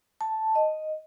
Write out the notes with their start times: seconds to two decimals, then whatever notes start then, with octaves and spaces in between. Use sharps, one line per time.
0.21 A5
0.55 D#5